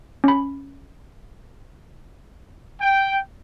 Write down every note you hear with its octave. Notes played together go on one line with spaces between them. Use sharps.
C#4 B5
G5